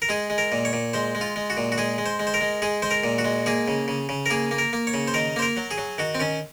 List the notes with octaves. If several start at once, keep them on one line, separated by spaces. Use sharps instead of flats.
A#4
G#3 G#4
G#3
A#4
A#2
C#5
A#2
G#3 C5
G#3
F4
G#3
F#4
A#2
F#4
G#3 G#4
G#3
C5
G#3
C5
A#4
G#3
G#3 G#4
G#3 C5
A#4
A#2
F#4
G#3
A#3 G#4
C#3
C#3
C#3
A#4
A#3 G#4
A#3
A#4
A#3
C#5
C#3
C5
D#3 A#4
A#3 C5
A#4
F#3
G#4
F#3
D#3 F#4
C4
D#3 C#4